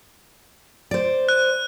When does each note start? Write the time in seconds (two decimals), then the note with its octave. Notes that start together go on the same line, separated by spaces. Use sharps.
0.91 C5 D5
1.29 F#6